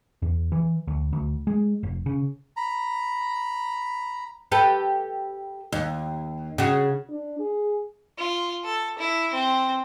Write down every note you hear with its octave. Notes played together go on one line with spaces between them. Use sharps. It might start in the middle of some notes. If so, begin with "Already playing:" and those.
E2
E3
D2
D2
G#3
F1
C#3
A#5 B5
G4 A4 B4
D#2
C#3 F#4
D4
G#4
F4
A4
E4
C4